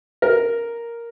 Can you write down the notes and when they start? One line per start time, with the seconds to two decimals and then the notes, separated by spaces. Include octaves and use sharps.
0.22 A#4